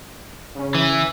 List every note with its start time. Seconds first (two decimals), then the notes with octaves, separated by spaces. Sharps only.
0.55 C#3 C#4
0.75 E3